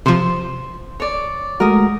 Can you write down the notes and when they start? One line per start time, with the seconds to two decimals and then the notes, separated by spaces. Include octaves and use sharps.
0.06 C3 F3 C5 C6
1.00 C#5 D5
1.60 G#3 A3 F#4 A#4 D#6